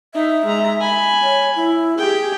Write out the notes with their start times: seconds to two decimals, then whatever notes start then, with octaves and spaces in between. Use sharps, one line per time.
0.14 D#4 E5
0.45 G#3 A#5
0.80 G#5 B5
1.23 C#5
1.56 E4
1.97 G4 G#4 G5